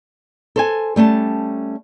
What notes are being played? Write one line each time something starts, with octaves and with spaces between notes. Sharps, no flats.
A4 C5 G#5
G3 A3 C#4 A5